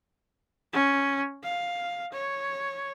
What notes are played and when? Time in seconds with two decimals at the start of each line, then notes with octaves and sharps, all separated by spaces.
0.73 C#4
1.43 F5
2.12 C#5